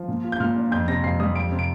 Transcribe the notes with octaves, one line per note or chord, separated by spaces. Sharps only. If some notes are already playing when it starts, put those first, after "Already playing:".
Already playing: F3
A#2
F4
G6
A#2 F6
D4
F2 G6
C3 A#6
F2 C7
G3 D#6
F2 D7
C3
D7